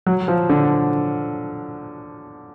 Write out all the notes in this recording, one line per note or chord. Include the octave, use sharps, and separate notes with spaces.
F#3
F3
D3